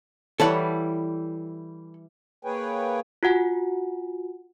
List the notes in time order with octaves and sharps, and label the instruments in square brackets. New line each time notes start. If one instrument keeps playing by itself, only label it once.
[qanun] E3 G3 [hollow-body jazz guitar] A4 C#5 F#5
[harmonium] A#3 G#4 B4 C#5 G5 G#5
[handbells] F4 F#4 F#5 G#5